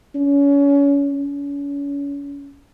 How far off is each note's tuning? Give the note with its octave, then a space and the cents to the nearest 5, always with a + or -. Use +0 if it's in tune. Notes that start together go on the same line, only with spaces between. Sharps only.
C#4 +30
C#4 +35